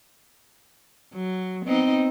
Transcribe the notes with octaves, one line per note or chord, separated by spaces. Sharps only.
F#3
B3 C4 D#4